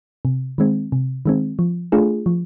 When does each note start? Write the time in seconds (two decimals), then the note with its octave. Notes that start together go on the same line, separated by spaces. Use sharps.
0.25 C3
0.58 D#3 G#3 C4
0.92 C3
1.26 D#3 G#3 C4
1.59 F3
1.92 A3 D4 F4 G#4
2.26 F3